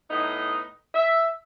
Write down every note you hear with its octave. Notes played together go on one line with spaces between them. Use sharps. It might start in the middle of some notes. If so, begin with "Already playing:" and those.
A2 B3 D#4
E5